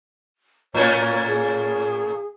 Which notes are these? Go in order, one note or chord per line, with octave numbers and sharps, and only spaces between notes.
A2 A#3 C#4 C#5
G#4